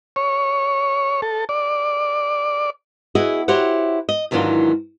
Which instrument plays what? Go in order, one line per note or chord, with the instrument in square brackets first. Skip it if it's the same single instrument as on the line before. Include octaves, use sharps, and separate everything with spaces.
[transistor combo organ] C#5
A4
D5
[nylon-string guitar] E4 F#4 G#4 B4 D#5
E4 F#4 G4 C5 C#5 F#5
D#5
G#2 D#3 E3 F#3 D4 F4